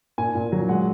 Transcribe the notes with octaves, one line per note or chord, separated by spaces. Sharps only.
A#2 G#5
A#2
F#3
G#3 F#5